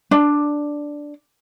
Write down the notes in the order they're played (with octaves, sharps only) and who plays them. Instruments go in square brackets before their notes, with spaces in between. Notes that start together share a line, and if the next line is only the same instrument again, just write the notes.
[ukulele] D4